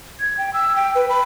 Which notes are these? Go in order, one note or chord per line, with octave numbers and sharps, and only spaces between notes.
G#6
G5
E6
G5
B4
B5